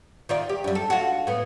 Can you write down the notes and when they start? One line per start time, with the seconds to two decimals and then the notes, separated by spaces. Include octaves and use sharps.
0.29 D#3 F4 D5
0.49 G4
0.64 F#2 G3
0.75 A4
0.90 F4 F#4
1.27 A2 B3